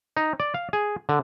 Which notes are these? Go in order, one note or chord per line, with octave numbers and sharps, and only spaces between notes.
D#4
D5
F5
G#4
D3